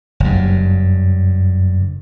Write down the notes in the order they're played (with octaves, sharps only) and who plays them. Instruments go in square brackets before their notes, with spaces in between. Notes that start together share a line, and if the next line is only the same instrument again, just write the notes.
[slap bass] F#1 G2